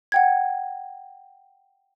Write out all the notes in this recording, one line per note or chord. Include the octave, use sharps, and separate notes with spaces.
F#5 G5 G#6